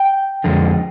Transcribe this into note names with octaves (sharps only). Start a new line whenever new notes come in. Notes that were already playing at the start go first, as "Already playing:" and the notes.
Already playing: G5
F2 D3 G#3